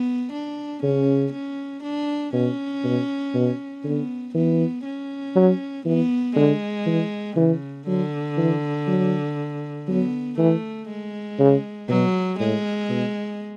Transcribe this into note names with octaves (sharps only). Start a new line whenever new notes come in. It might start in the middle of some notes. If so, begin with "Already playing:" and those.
Already playing: B3
D4
C#3 C#4
C#4
D4
B2 C#4
B2
B2
D3 B3
E3 B3
C#4
F#3
E3 B3
D3 G#3
E3
C#3 E3
D3 F#3
E3
F#3
F#3 B3
E3 A3
G#3
C#3
B2 F#3
A2 G#3
B2